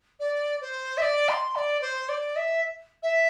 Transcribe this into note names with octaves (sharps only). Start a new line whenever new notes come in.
D5
C5
E5
D5
C6
D5
C5
D5
E5
E5